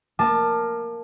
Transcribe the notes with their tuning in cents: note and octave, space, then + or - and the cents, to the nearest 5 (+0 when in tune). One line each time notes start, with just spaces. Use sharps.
A#3 +0 A5 +5 D6 +35